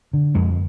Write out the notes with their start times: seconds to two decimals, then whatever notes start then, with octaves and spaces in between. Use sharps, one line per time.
0.13 D3
0.35 F2 G#3